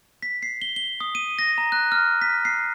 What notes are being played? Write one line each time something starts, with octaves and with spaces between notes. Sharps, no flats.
B6
C7
G7
G7
D#6
D#7
A#6
A#5
F#6
F6
B6
C7